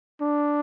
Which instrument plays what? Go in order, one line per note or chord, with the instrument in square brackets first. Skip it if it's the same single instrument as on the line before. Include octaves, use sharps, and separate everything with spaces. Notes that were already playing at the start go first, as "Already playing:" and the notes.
[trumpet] D4